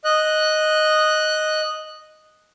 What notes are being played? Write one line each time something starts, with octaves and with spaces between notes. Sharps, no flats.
D#5 F#6